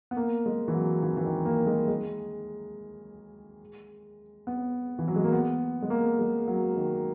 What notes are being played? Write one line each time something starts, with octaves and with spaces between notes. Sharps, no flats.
B3
A#3
G#3
E3
F#3
E3
E3
D#3
A#3
G#3
G#3
B3
E3
F#3
G#3
A#3
B3
G#3
A#3
G#3
F#3
D#3